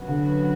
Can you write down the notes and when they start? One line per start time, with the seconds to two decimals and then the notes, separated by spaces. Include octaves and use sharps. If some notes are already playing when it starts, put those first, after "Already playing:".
Already playing: C#3 F#3 B3 F#4
0.08 D3